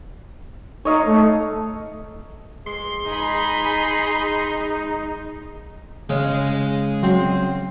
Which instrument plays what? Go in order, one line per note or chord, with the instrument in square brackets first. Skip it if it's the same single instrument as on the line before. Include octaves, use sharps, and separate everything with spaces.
[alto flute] D#4 [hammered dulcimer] C#5 D#5 F5
[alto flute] A3
[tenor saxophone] G#3 [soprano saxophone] C6
[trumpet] D#4 [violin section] G#4 B5
[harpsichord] C#3 [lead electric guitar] G#3 D#5
[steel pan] F#3 [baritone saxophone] C4